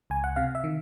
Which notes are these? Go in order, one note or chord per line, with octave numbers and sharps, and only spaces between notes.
C#2 G#5
F#5
C3 F5
E5
D#3